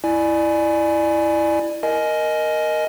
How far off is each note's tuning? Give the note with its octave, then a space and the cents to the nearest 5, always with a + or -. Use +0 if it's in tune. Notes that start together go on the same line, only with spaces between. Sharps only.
E4 +0 D5 +25 G#5 +10
A#4 +0 D#5 +0 G#5 +25